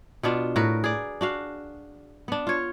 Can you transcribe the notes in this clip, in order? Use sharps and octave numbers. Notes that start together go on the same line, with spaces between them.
B2 B3 D4 F4
A2 F#4 A#4 B4
G#4 D5
D4 F#4 F5
B3 D4
F4 C#5